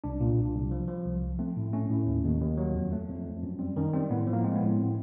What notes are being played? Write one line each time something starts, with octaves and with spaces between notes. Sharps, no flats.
C2 D4
A#2
C2
C2
F3
F3
C2
F3
A3 C4
A2
A3 C#4
A2
D#2
D#2
D#2
F#3
F2
A3
F2
F2
F#2
G3 C4
D#3 C#4
G3 C4
A2 B3
F3
A#3
G#3 C4
B3
A2
C4